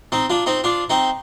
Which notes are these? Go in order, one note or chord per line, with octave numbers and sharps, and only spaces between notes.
C4 D#4
D4 F4
C4 D#4
D4 F4
C4 D#4